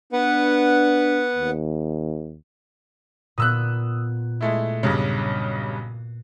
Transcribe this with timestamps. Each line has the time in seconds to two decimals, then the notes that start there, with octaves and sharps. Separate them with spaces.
0.13 B3 D4 B4 F#5
1.36 D#2
3.38 A#2 B3 D#6 E6 F#6
4.41 G#3 A3 E4
4.83 B1 G2 C#3